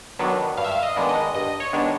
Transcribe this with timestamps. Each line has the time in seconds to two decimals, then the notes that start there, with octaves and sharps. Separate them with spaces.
0.19 D#3 F#3 B3 D4
0.57 G2 F5
0.64 E5
0.72 F5
0.83 D#5
0.96 D#3 G#3 B3 D4
1.09 D#5
1.35 G2 D#5
1.60 C#5
1.73 D#3 G#3 B3 D4